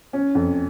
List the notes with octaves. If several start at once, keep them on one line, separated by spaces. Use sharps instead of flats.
C#4
F2